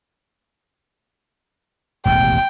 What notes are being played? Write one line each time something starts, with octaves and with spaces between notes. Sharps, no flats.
E1 A1 D#2 G5